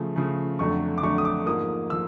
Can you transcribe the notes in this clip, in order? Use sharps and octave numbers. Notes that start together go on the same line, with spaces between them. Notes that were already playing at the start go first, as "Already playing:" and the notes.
Already playing: C#3 F3 A3
C#3 F3 A3
F2 D3 F#3 A3 C#6
D6
F2 D3 F#3 A3 C#6
D#6
D6
G#2 F3 A#3 D#6
F3 E6